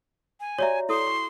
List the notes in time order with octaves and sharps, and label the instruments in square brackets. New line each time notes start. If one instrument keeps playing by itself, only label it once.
[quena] G#5
[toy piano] F#4 G4 E5 [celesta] C#5 D5 A#5
[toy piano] E4 A4 D#6 [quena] C6
[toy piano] C#6